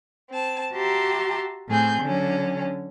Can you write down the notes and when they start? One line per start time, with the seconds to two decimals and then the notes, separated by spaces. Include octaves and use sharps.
0.30 C4 A5
0.73 F#4 G4 E5 A5 A#5 C6
1.68 A2 C4 G#4 G6
2.01 D3 F#3 C#4